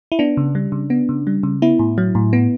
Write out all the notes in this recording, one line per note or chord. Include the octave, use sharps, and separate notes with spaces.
E4
B3 D4
C#3
G3
C#3
B3
C#3
G3
C#3
B3 E4
A2
F#3
A2
B3